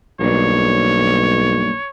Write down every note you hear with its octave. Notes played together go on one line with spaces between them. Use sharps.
B1 G2 A#3 D4 C#5